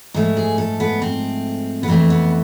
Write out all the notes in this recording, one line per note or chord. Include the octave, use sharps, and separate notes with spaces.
G#2 F3 A3
G#4
A4
B3
C4
B3
F2 E3 A3 C4
B3